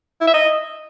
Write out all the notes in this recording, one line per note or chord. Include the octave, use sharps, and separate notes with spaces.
E4
E5
D#5